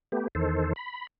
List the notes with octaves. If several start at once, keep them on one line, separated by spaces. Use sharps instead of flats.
A3 B3 G4
E2 D#3 A4 C5
B5